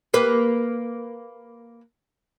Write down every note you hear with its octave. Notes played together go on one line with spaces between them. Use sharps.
A#3 B4